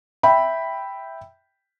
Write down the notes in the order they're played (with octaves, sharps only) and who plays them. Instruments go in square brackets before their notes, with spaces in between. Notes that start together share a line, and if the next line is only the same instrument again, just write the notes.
[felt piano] E5 G5 B5